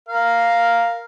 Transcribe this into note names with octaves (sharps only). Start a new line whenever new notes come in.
A#4 F5